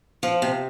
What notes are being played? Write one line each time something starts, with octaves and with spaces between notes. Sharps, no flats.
F3
C3